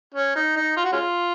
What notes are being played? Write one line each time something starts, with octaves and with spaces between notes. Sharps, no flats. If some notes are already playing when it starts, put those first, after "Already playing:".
C#4
D#4
D#4
F4
F#4
G#3 C#4 F4